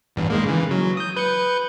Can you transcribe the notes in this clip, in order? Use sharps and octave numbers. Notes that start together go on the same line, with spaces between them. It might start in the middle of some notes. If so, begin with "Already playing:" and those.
A1 E2 G2
D#3 G#3 A#3
C#3 E3
F#3
D#6 G6
B4 G6 C#7